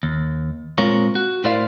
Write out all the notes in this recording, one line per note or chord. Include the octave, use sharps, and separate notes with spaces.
D#2
A#2 G#3 C4 F4 A#4 C#5
F#4
A2 E4 A#4 C5 D5 F5